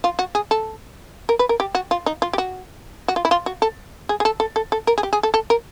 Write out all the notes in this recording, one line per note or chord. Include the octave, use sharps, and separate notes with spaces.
F4
F#4
G#4
A4
A#4
B4
A#4
G4
F#4
F4
D#4
F4
G4
F#4
F#4
F4
E4
F4
F#4
A4
G#4
G#4
A4
A4
A4
A4
A#4
G#4
G4
G#4
A4
A4
A#4